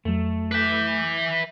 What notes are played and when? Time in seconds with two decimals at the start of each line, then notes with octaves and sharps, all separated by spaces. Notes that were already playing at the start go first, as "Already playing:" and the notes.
0.05 F2 F#3 A3
0.51 B4 E5 D6 G6